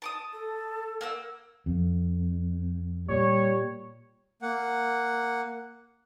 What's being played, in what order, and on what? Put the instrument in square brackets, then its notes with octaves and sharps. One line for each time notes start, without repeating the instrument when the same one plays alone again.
[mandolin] A5 D6 D#6
[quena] A4
[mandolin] A#3 F#5 E6
[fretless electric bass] F2
[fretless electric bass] A#2 [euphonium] G3 [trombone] C#5
[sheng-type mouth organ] A#3 F#5